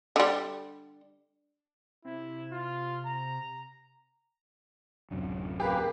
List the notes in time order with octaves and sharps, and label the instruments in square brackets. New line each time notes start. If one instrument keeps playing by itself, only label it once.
[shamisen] D3 G3
[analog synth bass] C3 [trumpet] E4
[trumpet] F4
A#5
[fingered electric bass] D1 F#2 C3
[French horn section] A#3 [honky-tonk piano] G4 G#4 [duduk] B4